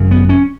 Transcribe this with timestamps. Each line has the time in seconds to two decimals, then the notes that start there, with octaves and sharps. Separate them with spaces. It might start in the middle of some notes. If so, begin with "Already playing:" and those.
Already playing: G#1 F#2 C#3
0.11 B3
0.29 C#4